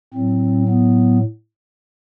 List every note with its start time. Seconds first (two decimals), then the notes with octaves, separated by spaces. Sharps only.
0.14 A2 F#3 C4
0.68 B3